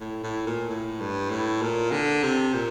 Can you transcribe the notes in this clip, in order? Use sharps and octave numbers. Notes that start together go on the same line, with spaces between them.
A2
A2
A#2
A2
G2
A2
A#2
D3
C3
A#2